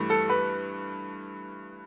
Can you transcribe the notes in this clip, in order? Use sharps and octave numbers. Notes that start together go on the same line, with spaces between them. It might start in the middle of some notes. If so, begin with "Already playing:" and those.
Already playing: G2 E3 A3
A4
B4